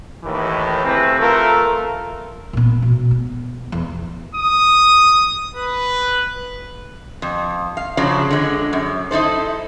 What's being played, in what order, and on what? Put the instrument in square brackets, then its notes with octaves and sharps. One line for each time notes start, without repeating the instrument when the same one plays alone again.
[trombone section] D#2 A2 D#3 E3
C3 A3 C4 G#4 B4
A3 F4 A4 A#4
[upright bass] A#2 B3
B2
B3
E2
[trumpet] D#6
B4
[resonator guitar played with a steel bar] F2
F5
C#3 F3 F#3 D4
D3 G#3
F#2
D#4 E4 A4 C5